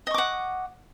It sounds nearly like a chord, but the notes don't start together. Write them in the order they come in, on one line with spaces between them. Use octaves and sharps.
D#5 C#6 D6 F#5